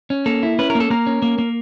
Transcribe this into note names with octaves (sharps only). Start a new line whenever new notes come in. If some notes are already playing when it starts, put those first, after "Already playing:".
C#4
A#3 A4
E4
C#4 B4
A#4
A#3
A4
A#3 A#4
C#4
A#3
A#3